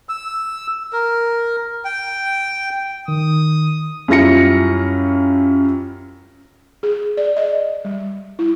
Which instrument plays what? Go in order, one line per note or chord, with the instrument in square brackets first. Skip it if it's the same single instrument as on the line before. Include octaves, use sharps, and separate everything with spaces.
[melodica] E6
A#4
G5
[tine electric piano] D#3 [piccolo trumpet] D#6
[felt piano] F#2 G3 E4 F4 A#6 C#7
[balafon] G#4
D5
D#5
G3
E4